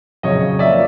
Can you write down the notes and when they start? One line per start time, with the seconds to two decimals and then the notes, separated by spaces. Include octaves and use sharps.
0.23 F2 C#3 F#3 C#5 D#5
0.59 F3 A#3 D5 E5